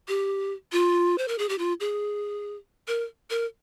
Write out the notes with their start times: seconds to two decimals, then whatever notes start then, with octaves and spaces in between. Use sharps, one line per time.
0.08 G4
0.72 F4
1.18 C5
1.28 A#4
1.38 G#4
1.49 G4
1.58 F4
1.80 G#4
2.88 A#4
3.30 A#4